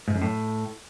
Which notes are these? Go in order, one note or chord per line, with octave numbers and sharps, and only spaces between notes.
G#2
F#2
A2